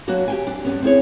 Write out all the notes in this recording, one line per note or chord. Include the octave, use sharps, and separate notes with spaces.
F#3 A#3 B3 D4 F#4
G4 G5 G#5
D4
G2 B3 C#4
C4 E4 G#4 C#5